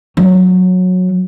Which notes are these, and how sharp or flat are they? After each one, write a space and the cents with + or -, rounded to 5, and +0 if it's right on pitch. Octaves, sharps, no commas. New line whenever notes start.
F#3 -15